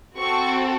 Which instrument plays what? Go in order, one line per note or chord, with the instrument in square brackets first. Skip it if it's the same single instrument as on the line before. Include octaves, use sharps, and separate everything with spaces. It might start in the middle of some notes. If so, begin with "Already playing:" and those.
[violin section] C4 F#4 A4 C#6